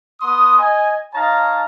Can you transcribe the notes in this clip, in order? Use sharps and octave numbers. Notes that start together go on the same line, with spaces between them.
B3 C6 D#6
D#5 G#5
D#4 C#5 F5 A5 A#5